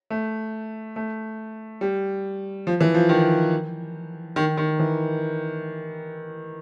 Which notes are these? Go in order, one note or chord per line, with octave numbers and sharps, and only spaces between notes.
A3
A3
G3
F3
E3
F3
D#3
D#3
D#3
E3